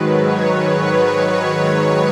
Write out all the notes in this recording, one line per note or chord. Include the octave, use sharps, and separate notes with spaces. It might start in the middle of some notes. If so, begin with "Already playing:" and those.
Already playing: G#2 D#3 F#3 B4
C#5
B4
C#5